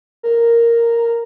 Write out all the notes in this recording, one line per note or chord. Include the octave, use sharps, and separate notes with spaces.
A#4